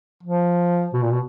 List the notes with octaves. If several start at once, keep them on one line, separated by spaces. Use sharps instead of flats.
F3
B2
A#2
B2